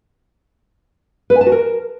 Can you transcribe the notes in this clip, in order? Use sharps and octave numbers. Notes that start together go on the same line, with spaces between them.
B4
G#5
A5
F#4
A#4